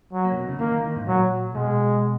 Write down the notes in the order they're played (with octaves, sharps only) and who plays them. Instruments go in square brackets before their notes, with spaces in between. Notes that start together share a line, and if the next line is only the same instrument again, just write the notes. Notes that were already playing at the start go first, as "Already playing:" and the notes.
[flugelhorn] F#3
[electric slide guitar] A#3
C#3
B2
C#3
[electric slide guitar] D#3 [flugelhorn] A#3
[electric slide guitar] D#3
D#3
G#2
[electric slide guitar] A#2 [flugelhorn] F#3
[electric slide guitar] B2 [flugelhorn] G#3